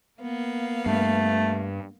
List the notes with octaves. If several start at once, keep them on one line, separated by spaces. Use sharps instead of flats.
A#3 B3 F5
G2 A3